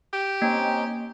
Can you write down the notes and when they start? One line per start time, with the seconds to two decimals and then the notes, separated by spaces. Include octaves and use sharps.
0.13 G4
0.42 A#3 C4 C#4 D#4